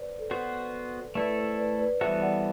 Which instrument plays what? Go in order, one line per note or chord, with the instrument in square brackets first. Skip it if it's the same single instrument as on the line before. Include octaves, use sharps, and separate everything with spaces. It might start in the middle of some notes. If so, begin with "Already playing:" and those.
Already playing: [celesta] B4 C5 D5
A4
[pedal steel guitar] B3 F#4 C5 [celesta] B4
[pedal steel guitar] A3 E4 A4 [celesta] B4 D5
[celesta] C5
B4 D5
B4 D5
[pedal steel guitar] E3 G3 B3 F#4 A4 [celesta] C5 E5
[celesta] D5 F#5